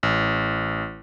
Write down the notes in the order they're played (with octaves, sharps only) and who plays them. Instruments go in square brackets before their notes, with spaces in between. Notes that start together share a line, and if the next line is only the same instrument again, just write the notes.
[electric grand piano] A1